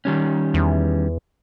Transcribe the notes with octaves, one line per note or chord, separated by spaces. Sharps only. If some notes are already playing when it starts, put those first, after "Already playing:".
D#3 G3 C#4
E2